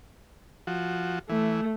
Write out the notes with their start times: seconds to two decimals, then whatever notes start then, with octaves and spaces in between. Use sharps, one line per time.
0.67 F3 F#4
1.29 E3 A3